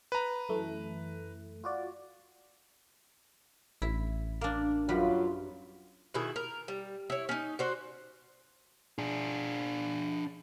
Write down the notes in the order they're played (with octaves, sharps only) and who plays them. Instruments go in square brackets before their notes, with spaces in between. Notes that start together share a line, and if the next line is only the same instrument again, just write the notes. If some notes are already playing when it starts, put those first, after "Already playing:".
[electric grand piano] B4 A#5
[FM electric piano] F#2 E3 A3
F4 F#4 D5
[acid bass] A1 [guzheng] E4
[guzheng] A#3 D4
[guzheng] F#2 G3 B4 [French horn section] F#3 F4
[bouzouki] B2 D#3 E4 G#4
A#4
G3
E4 C#5
C#4 D#4
F#4 C5 D5
[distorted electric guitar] D4 G#4